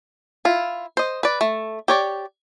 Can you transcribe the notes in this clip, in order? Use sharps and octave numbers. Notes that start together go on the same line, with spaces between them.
E4 F4
C5 D#5
B4 D5
A3
G4 C#5 D5